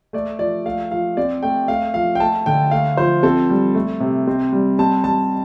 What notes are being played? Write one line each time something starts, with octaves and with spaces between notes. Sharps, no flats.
A3 D5
F3 D5
A3 F5
F3 F5
C4 D5
A3 G5
A3 F5
F3 F5
G5
A3 A5
D3 G5
A3 F5
F3 C5
C4 A4
G3
A3
C3
C4
G3
C4 A5
G3 A5